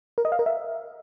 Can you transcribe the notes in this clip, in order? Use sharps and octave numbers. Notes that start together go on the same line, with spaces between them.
A#4
D#5
F5
A#4
E5